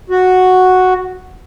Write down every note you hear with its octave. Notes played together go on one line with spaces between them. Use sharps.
F#4